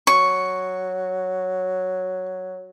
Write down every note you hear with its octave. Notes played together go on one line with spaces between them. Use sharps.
F#3 C#6